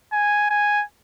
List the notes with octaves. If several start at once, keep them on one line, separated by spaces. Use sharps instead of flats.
G#5
G#5